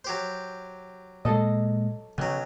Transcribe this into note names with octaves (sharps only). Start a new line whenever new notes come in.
F#3 G4 C5
A#2 G#3 A4 D#5
B1 C#3 F#3